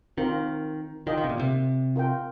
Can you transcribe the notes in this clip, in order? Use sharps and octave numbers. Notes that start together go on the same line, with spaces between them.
D#3 C4 F4 A#4
D#3 F4 A#4 D#5 G5
D#3
C3
A#2
C3
F4 A#4 G5